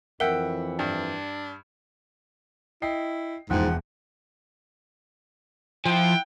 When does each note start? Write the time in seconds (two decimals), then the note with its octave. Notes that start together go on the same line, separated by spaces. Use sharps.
0.20 F2 E3 A#4 E5 F#5 G5
0.79 G2 D4
2.82 E4 D#5 G5 C7
3.50 E1 E2 G#2 F3 F#5 G5
5.86 F3 E4 F#5 G5